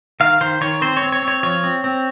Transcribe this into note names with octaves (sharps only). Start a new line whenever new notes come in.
D#3 F5
D#3 C5
D#3 C#5
C4 C5
C#5
C4
C#5
C4
C#5
F3 C#5
C4
C4